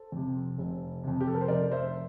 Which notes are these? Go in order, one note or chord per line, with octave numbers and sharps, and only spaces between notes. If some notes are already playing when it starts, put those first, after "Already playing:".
Already playing: A4 C5
F2 C3
F1
F2 C3
G4
A4
A#4
C5
F1 A#4 D5
C5 E5